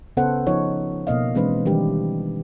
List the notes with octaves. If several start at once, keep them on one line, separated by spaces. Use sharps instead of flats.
C#3 B3 C#4 A4 C5 F#5
F3 D#4 C#5
B2 A#3 D#5 F5
E3 G#3 C4 D4 B4 C5
D#3 E3 G3 D4 G4